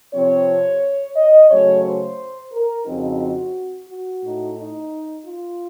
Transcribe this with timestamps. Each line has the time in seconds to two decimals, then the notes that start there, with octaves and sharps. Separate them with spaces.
0.14 C3 F3 C4 C#5
1.16 D#5
1.50 C#3 F#3 A3 C#5
1.84 C5
2.52 A#4
2.85 F2 C#3 F3 C4 D#4 F#4
3.88 F#4
4.21 A2 A3 D#4
4.56 D#4
5.24 F4